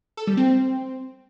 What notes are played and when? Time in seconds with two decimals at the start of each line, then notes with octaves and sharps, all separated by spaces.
0.17 A4
0.27 G3
0.37 C4